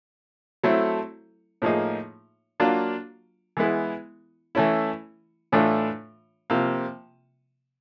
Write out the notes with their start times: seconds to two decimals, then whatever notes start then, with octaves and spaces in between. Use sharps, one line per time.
0.64 F#3 A3 C4 E4 A4
1.62 A2 F3 A#3 D#4 G#4
2.60 F#3 A#3 D4 F4
3.57 E3 G#3 B3 E4
4.55 E3 A3 C#4 E4
5.52 A2 E3 A3 D4 F4
6.50 C3 F3 A#3